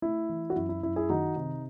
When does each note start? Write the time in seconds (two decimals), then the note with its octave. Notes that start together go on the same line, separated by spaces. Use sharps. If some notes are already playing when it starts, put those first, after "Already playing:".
0.02 A3 E4
0.29 E3
0.50 F#4
0.56 F#2 E4
0.69 E4
0.82 F#2 E4
0.96 E4 G#4
1.10 D#3 D#4 F#4
1.36 C3 D#4